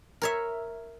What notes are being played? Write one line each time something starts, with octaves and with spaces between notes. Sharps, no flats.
A#4 C#5 E5